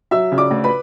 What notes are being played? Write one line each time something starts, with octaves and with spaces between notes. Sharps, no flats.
F#3 E5 E6
C#3
D5 D6
D2
B4 B5